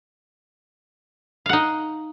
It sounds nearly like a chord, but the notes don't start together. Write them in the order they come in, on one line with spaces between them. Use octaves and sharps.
F5 F#5 D#4